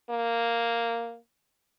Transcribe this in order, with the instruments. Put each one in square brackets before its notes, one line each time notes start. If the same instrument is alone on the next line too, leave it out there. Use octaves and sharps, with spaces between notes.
[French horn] A#3